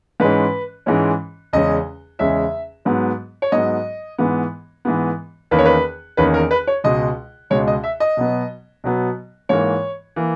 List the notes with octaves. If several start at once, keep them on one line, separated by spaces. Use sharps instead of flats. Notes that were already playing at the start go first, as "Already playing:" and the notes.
G#2 E3 G#3 C#4 B4
G#2 E3 G#3 C#4
E2 C#3 G#3 C#4 D#5
E2 C#3 G#3 C#4 E5
G#2 F#3 B3
C#5
G#2 F#3 B3 D#5
G#2 E3 B3
G#2 E3 B3
E2 D#3 A#3 C#4 B4
C#5
B4
E2 D#3 A#3 C#4 B4
A#4
B4
C#5
C#2 B2 G#3 D#5
C#2 B2 G#3 C#5
D#5
E5
D#5
B2 F#3 B3
B2 F#3 B3
G#2 E3 A#3 C#5
E3 A#3